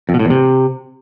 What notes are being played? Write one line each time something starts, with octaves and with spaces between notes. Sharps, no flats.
F2
B2
A2
E2
C3